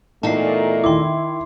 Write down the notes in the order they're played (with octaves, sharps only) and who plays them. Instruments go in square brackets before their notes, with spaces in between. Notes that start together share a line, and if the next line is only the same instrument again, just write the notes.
[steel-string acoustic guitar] E2 D#4 [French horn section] A#2 A3 [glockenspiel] A5 C7
[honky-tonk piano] D#3 E4 [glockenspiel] C6 D6